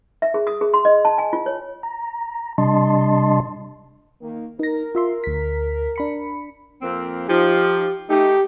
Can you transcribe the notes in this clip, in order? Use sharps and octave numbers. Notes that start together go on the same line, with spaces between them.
E5
G#4
D#6
G#4
C6
D#5
A5
G#5
F4
C#5
A#5
C3 G3 D4 D#5 A5 C6
D#3 A#3
D#4 A#4 A#6
F4 E5 C6
D2 B6
D4 B5 C#7
F2 A#3 C4
F3 D#4 G4
A3 D#4 G4